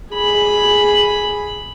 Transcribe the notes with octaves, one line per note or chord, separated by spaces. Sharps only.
G#4 B5